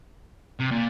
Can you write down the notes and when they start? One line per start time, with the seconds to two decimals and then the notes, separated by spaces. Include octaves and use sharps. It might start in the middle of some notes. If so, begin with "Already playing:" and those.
0.60 C3
0.71 A#2